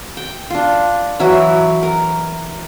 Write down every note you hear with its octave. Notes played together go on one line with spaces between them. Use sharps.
G5
D4 F4
E3 F#3 E4
A#4